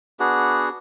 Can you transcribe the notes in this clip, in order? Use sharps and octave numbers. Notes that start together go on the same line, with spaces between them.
B3 D4 F#4 G#4